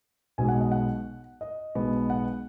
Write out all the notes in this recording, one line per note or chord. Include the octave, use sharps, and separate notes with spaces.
B1 B2 G#3 B3 G#5
F#5
D#5
F#5
D#5
B1 B2 G#3 B3
F#5